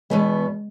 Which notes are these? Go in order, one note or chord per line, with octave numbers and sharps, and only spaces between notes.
E2 B2 G#3 B3